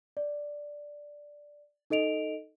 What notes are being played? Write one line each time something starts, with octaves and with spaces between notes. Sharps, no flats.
D5
D#4 A4 D#5 D7 F7